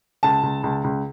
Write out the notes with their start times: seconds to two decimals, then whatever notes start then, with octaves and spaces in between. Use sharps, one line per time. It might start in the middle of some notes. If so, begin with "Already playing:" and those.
0.23 C#2 A5
0.43 C#2
0.63 C#2
0.84 C#2